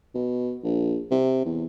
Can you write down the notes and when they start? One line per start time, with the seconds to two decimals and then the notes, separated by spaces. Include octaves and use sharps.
0.15 B2
0.63 A#1
1.11 C3
1.45 E2